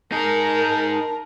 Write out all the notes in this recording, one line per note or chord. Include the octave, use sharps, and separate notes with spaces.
D#4 G#4 A#4 A5